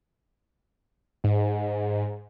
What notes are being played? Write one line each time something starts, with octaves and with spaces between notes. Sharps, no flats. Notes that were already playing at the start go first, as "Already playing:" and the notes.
G#2